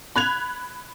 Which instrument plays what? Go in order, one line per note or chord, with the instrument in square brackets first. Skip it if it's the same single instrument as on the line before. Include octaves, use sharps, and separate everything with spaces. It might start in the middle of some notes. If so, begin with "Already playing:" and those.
[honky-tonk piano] B5 F#6 G#6 F7